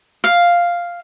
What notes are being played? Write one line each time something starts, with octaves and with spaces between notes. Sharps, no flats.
F5